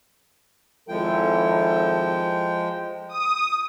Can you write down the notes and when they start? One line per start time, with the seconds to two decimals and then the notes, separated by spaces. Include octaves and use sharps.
0.89 G#1 F3 G#3 E4 A4 G5
3.08 D#6